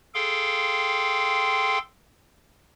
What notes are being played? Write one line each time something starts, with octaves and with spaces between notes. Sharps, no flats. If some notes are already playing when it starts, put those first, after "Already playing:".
G#4 A4 F5 G5 C6